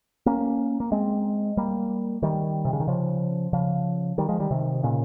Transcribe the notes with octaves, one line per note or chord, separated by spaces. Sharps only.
A#3 C#4
A#3
G#3 C4
G3 A#3
D#3 G3
C3
C#3
D#3
C#3 F3
C#3 F3
D#3 G3
F3 G#3
D#3 G3
C3 D#3
A#2 C#3